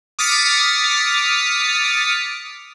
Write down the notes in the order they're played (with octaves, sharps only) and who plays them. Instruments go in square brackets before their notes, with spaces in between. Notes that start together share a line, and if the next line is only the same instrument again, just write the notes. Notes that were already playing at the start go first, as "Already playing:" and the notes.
[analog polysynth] D6 D#6 F6 A6 B6 C#7